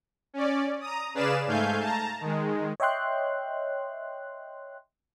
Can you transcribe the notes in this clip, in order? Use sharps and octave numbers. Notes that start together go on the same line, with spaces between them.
C#4 D5
A#5 D#6
C#3 G#4 B4 D5 F5 E7
G#2 A3 F5 G#5 G6
A5 A#5
D#3 G#3
C#5 D#5 E5 G5 C6 F#6